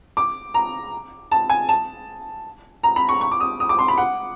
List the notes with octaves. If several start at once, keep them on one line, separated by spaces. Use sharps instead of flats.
D6
A#5
A5
G#5
A5
A#5
B5
C#6
C#6
D6
D#6
D#6
D6
C6
B5
F#5